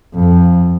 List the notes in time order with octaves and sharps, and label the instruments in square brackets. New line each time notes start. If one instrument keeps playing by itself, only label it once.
[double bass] F2